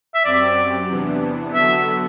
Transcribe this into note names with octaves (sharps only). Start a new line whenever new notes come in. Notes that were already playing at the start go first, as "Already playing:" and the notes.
E5
F#2 F#3 C4 G4 D5
E2 C3 E3 B3 D4
D3 F#3 B3 F#4 A4 E5